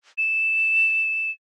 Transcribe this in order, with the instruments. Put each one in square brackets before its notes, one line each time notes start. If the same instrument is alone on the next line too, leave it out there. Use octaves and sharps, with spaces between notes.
[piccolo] E7